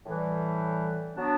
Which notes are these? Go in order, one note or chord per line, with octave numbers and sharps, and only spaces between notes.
A2 E3 G3
F#3 B3 D4